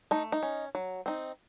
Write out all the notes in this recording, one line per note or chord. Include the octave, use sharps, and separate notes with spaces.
A3 D#4
D#4
C#4
F#3
C4 D#4